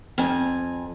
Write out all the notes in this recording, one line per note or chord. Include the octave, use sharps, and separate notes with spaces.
F2 G#5